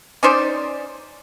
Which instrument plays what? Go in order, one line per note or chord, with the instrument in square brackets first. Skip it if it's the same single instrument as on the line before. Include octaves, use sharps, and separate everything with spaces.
[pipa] C#4 D#4 C5 D5